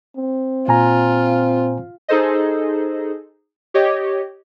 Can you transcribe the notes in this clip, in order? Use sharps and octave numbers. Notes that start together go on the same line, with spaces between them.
C4
A#2 F4 G#5 A#5
D#4 G#4 A4 C5 D#5
G4 C#5 D#5